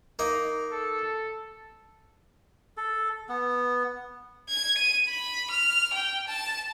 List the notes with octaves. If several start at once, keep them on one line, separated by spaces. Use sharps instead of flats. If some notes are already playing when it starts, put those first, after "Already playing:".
A#3 D#4
A4
A4
B3
G#6
D#7
B5
F6
G5
A5